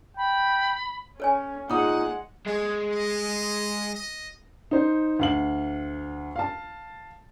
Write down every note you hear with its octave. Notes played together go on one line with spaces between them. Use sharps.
G5 B5
C#4 A4 C#5 G#5
A#2 G#3 D#4 F#5 C#6 D#6
G#3 C#5
D#5
D#5
D#4 C5
D2 F5 F#7
F5 A5